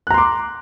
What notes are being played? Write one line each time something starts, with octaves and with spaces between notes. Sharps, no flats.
A#5 C6 D6 F#6